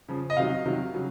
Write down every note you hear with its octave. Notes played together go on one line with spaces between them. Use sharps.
C#3 F3
D#5
C3 D#3 F#3 F5
C3 D#3 F#3
C#3 F#3